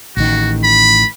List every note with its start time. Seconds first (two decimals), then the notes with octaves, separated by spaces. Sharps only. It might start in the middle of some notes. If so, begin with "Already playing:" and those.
0.17 A1 D#3 F#4
0.63 B5